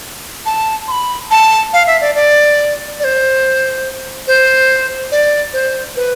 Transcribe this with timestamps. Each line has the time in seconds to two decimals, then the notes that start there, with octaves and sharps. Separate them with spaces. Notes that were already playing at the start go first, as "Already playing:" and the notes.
0.46 A5
0.88 C6
0.92 B5
1.31 A5
1.73 F5
1.87 E5
2.01 D5
2.15 D5
3.00 D5
3.04 C5
4.27 C5
5.12 D5
5.53 C5
5.96 B4